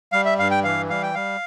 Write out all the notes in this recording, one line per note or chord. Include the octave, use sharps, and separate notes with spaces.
G3 F5
E5
G2 F5
G5
E3 F5
G3 F5
G5
G3 F5